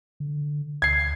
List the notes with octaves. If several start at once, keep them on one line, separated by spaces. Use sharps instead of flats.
D3
D2 G#6 C7